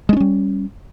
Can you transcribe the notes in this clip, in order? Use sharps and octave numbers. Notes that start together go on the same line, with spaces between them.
G3 G#3 C#4 D4